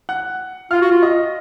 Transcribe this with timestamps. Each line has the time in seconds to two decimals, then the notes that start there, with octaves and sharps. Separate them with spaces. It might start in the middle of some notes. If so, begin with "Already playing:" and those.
0.09 F#5 F#6
0.71 F4 F5 F6
0.82 F#4
0.91 F4
1.03 D#5 D#6